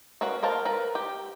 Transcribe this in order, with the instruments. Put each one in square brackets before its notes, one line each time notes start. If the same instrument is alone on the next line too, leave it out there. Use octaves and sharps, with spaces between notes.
[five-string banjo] A#3 C#4 F#4 B4
A#4 C5 F5 A5
A#4 B4
G4